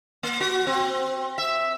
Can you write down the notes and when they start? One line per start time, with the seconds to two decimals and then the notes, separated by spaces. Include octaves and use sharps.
0.23 A#3
0.40 F#4
0.67 C4
1.38 E5